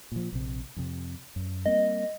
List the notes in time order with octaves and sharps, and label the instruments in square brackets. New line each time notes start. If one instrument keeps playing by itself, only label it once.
[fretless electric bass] A#2 F3
A#1 C3
F2 C3
F#2
[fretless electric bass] G3 A#3 C4 [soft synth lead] D#5